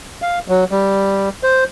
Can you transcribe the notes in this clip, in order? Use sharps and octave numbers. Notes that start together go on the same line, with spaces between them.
F5
F#3
G3
C5